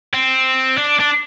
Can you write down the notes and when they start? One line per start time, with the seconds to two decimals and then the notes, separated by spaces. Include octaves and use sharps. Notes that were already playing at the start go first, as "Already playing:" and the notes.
0.14 C4
0.78 D4
0.99 D4